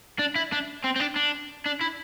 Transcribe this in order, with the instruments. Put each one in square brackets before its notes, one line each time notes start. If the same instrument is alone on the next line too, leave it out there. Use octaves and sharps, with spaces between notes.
[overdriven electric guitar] D4
E4
D4
C4
C4
D4
D4
D4
E4